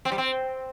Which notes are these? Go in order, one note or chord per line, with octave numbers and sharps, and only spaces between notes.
C4
G3
C4